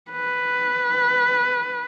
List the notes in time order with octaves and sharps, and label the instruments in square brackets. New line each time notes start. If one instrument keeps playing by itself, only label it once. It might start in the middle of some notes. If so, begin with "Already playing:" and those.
[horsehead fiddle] B4